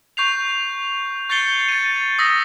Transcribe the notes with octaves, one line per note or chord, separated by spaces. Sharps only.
C#6 G6 C7 F7
C#6 G6 A6 C7 C#7 G7
A6 D#7
D#6 E6 A#6 B6